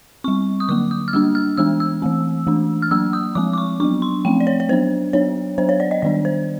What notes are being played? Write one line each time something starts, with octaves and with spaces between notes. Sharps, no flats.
G3 C4 C#6
D#6
D3 F#3 A#3 D6
D#6
F6
G3 A#3 D4 E6
F6
E3 G#3 B3 D4 E6
E6
E3 A3 C4
E3 A3 D4
F6
F#3 A#3 D4 E6
D#6
F3 G#3 C4 D6
D6
C#6
F#3 B3 D4 C#6
C6
F3 A3 C4 G5
D5
C#5
C#5
F#3 B3 D4 C5
F#3 B3 D4 C#5
F#3 B3 D4 C5
C#5
D5
D#5
D#3 G3 B3 D4 D5
C5